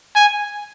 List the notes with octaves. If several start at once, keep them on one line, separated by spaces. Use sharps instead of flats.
G#5